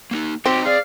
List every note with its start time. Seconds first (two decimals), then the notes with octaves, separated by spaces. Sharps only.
0.11 A#3 C#4 D#4
0.46 C4 D#4 F#4 G4 D#5
0.65 G#4 D5 F5